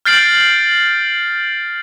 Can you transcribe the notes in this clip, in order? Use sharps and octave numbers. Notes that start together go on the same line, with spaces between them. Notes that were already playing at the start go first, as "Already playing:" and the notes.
F6 G6 A6 C7 D7 F#7